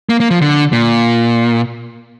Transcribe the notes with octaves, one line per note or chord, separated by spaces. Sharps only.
A#3
A#3
F3
D3
A#2